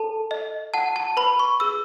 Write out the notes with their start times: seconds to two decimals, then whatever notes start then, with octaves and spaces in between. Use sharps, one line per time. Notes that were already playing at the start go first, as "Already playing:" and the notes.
Already playing: A4 A5
0.31 D#5
0.74 F#5 A5
0.96 A5
1.17 B4 B5
1.39 C#6
1.60 G#4 E6